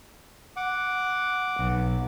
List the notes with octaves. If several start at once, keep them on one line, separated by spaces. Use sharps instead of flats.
F#5 D6
B1